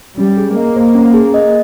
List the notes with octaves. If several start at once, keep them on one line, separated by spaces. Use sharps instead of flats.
G3 C#4
G#4
A#3 D#5
C5
C#4
G#4
D#5